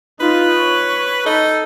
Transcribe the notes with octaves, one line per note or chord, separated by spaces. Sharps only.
D#4 F4 B4
C#5 C#6
D#4 A4